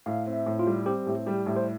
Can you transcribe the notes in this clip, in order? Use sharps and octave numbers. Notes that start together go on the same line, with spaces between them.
A2 F5
C4
E5
A2
F4
G3
C4 G4
A2
G3 G4
A2
C5